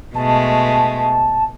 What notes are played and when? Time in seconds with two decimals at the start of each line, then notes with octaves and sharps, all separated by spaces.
0.15 B2 G#3 A3 A5